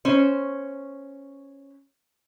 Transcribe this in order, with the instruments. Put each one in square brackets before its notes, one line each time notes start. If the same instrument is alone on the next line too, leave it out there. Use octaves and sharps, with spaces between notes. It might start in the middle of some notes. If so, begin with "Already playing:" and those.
[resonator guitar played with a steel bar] C#4 C5